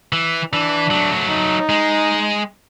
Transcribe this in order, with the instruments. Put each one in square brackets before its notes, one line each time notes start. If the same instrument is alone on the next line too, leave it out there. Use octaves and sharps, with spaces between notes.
[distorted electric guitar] E3
[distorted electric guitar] E3 [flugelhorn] D4
[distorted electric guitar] F#3 A3
[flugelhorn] D#4
[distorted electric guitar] G#3